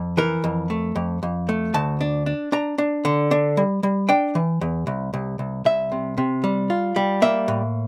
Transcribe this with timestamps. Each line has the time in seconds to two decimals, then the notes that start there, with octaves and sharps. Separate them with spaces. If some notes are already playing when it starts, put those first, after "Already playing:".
Already playing: F2
0.17 E3 A#4
0.44 F2
0.70 A3
0.96 F2
1.23 F2
1.49 A3
1.74 D2 A5
2.01 D4
2.26 D4
2.52 D4 A#5
2.78 D4
3.05 D3
3.31 D4
3.57 G3
3.83 G3
4.09 D4 G5
4.35 E3
4.61 E2
4.87 C2
5.14 C2
5.39 C2
5.65 C2 E5
5.92 C3
6.18 C3
6.44 G3
6.70 F4
6.96 G3
7.22 A#3 E5
7.48 A2